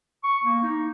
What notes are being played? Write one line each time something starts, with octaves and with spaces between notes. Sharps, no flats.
C#6
A#3
D#4